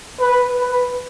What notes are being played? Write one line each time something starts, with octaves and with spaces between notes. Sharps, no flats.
B4
B4